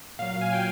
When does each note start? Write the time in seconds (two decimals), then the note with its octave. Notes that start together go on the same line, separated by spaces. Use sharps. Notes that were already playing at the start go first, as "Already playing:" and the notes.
0.19 A#2 F#3 F5
0.41 G#5
0.53 G5